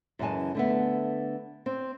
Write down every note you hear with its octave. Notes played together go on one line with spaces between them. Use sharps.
F#2 C#3 E3 G#3 G#5 A5
D3 A3 B3
C4